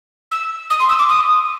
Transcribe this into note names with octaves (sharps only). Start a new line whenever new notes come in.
E6
D#6
C6
E6
D6
D#6